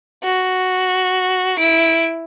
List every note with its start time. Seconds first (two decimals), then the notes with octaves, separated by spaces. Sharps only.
0.24 F#4
1.58 E4 D7